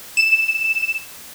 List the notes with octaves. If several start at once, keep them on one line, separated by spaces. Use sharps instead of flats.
E7